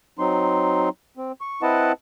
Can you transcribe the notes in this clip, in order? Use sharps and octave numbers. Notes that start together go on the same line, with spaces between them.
F#3 C4 D#4 C6
C4
C#6
C4 E4 B4 D#5 F#5 A5